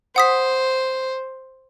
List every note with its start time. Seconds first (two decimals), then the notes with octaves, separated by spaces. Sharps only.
0.16 C5 F#5 D#6 B6